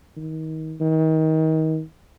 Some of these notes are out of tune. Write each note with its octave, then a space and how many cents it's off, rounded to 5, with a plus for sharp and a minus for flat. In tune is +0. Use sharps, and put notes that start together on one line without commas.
D#3 +30
D#3 +30